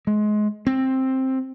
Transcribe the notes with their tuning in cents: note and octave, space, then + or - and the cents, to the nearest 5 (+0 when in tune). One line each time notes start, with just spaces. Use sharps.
G#3 +25
C4 +10